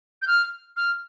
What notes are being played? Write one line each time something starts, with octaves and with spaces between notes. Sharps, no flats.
G6
F6
F6